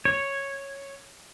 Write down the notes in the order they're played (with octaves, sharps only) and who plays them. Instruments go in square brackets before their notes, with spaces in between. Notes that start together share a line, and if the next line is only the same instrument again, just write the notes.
[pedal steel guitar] C#5